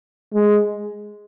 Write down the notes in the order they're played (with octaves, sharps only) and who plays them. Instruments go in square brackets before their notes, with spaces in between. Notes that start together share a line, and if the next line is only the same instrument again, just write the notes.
[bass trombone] G#3